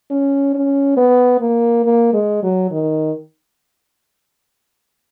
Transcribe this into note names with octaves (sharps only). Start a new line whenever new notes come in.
C#4
C#4
B3
A#3
A#3
G#3
F#3
D#3